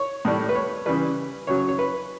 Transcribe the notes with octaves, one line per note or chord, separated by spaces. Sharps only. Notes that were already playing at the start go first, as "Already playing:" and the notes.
Already playing: C#5
A2 G3
B4
C#5
C#3 E3 G3 B4
C#3 F#3 C#5
C#5
C#5
B4